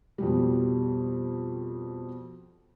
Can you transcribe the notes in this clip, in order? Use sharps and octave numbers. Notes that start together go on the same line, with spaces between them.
F2 B2 G3